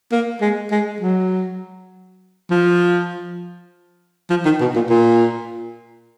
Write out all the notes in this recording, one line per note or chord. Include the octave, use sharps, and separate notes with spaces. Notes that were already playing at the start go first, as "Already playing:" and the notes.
A#3
G#3
G#3
F#3
F3
F3
D#3
B2
A#2
A#2